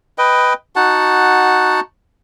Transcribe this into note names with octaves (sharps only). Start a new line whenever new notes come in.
B4 D#5 G5
D#4 F#4 F#5 A5